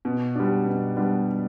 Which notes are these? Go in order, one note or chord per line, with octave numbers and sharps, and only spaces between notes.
B2
G3 B3 D4
B2
G3 B3 D4